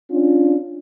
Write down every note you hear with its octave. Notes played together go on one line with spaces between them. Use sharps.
C#4 D4 F4